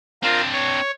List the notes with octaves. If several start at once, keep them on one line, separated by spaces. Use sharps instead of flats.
C4 D4 F4 A#4 F5
C#5